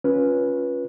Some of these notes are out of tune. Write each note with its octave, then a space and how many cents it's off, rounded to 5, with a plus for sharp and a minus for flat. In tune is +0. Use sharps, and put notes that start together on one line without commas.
C#4 +0 F4 +20 B4 -20